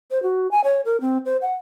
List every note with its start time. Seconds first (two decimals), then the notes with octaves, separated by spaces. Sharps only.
0.11 C5
0.23 F#4
0.51 G#5
0.64 C#5
0.85 A#4
1.01 C4
1.25 C5
1.42 F#5